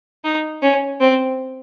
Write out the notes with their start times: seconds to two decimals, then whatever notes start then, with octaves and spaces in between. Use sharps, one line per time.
0.24 D#4
0.62 C#4
1.00 C4